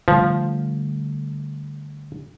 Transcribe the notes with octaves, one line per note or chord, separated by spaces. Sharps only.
D3 F3 G3 A3